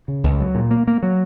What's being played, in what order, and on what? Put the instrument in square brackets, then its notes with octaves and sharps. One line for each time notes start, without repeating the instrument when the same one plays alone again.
[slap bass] C#3
C#2
F#3
A#2
A#3
A#3
F#3